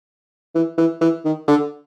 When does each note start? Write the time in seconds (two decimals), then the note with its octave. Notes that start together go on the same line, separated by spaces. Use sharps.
0.55 E3
0.78 E3
1.01 E3
1.25 D#3
1.48 D3